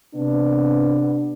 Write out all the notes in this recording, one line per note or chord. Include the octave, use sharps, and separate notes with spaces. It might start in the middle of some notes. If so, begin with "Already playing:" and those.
C3 B3 D4